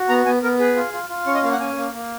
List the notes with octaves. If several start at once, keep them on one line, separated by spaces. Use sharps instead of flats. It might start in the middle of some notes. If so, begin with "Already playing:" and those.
Already playing: F#4
B3 A#5
B3 G#5
B3 A#4
G#4 B4
F4
F4
F4
C#4 C#5
D#5
A#3 F5
F#5
C#4 G#5
A#3
A#3